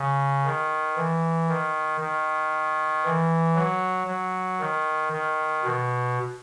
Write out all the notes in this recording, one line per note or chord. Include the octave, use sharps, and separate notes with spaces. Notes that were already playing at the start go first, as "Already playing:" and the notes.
Already playing: C#3
D#3
E3
D#3
D#3
E3
F#3
F#3
D#3
D#3
B2